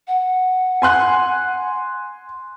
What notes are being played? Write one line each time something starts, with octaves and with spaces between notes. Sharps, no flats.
F#5
G#5 C6 F#6